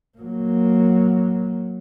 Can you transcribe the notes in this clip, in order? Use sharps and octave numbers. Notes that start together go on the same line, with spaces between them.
F#3 A#3